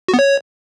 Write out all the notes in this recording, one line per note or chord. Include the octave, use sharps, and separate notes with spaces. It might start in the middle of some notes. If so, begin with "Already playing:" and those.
F#4
B3
C#5